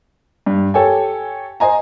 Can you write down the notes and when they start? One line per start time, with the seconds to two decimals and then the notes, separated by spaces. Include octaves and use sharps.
0.46 G2
0.74 G4 A4 C#5 G5 G#5
1.60 C5 D#5 G#5 A#5